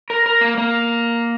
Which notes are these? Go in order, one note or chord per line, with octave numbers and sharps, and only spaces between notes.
A#4
A#4
A#3
A#3